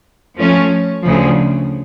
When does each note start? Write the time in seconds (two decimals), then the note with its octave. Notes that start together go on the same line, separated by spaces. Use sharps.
0.37 F3 A3 C#4
1.04 D2 C#3 F3